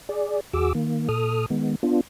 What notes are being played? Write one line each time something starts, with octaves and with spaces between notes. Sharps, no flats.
G#4 D5
E2 F#4 G#4 D6 E6
D#3 A#3
A#2 A4 D#6 F6
D#3 G#3 B3
B3 D4 F4